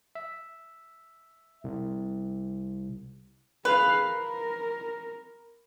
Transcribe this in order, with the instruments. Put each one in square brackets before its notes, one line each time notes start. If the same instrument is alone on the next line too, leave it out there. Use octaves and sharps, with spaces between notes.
[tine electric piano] E5
C2
[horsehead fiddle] G#4 F5 [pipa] B4
[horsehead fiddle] A#4